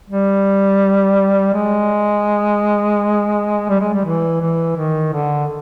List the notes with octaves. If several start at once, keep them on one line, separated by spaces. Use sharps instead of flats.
G3
G#3
G3
G#3
G3
E3
E3
D#3
D3